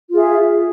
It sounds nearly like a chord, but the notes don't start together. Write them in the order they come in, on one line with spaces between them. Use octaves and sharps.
F4 G#4 E5